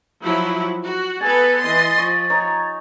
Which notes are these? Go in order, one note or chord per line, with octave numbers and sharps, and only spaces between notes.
F3 F#3 E4
F#4
B3 A4 B4 G#5 A6
E3 D#5 C6
F3 C#6
D#4 C#5 A#5